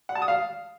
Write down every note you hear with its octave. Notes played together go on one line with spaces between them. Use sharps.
F#5
A5
D#6
F5